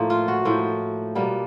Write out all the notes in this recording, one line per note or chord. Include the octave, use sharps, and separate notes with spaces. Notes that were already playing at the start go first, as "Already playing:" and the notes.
Already playing: A2 F3 A#3
F4
F#4
A2 F3 A#3
B2 G3 A#3